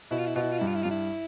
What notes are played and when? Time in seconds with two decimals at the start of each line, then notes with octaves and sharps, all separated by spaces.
0.11 B2 E4
0.18 F4
0.26 E4
0.35 B2 F4
0.42 E4
0.51 F4
0.58 E4
0.61 G2
0.67 F4
0.75 E4
0.83 G2 F4
0.90 E4